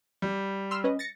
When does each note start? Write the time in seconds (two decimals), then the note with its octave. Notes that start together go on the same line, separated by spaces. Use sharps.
0.22 G3
0.71 C6 E6 F6
0.84 C#4 B4 D#5
0.99 A6 A#6 C#7